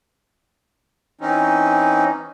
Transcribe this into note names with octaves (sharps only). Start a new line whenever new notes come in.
E3 C4 C#4 D#4